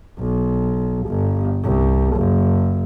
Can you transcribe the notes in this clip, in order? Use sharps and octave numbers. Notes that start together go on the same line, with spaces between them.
B1
G1
C2
F#1